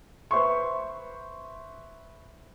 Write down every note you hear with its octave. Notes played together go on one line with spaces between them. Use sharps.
B4 C5 E5 C6 C#6